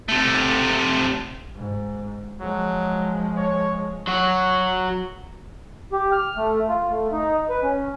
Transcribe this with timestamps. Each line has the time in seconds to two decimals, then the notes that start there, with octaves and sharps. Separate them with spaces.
0.09 C3 A3
1.55 G#2
2.41 F3 F#3 G#3
3.37 C#5
4.07 F#3 F#4
5.92 G4
6.12 F6
6.36 A3
6.69 F4
6.90 A3
7.12 D#4
7.49 B4
7.63 C#4